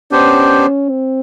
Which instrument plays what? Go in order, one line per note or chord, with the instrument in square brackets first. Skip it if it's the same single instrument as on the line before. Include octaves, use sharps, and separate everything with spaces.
[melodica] B3 D4 G4 C5 [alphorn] C#4
[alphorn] C4